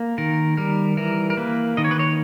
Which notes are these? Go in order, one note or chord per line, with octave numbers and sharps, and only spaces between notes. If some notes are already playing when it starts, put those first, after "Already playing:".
Already playing: A#3
D#3 A#4
G3 A#4
E3 A#4
A#4
A#3 B4
D#3 D#5
C#5
B4
C#5